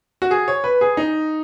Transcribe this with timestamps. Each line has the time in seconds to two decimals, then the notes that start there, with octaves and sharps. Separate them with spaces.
0.22 F#4
0.31 G#4
0.48 C#5
0.64 B4
0.81 G#4
0.97 D#4